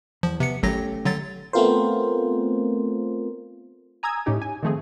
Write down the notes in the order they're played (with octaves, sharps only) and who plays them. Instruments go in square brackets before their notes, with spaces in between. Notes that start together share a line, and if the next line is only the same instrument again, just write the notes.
[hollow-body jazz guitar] E2 [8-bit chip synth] F3
[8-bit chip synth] C3 C#7 [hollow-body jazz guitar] B3
[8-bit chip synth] G#1 F#3 A#6 [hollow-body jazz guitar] A3 C#4 G4
[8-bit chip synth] D3 F#3 A6
[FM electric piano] A3 B3 C4 F4 A#4 C5
[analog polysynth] G#5 A#5 D#6 E6 G#6
A2 C#4 D#4 G4
G#5
D#3 F3 A3 C4 G#4